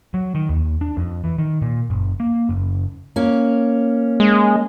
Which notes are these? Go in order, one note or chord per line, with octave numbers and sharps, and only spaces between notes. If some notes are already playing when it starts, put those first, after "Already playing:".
F#3
D#3
D#2
D4
F2
E3
D#3
A#2
F#1
A#3
F#1
A#3 C#4
G#3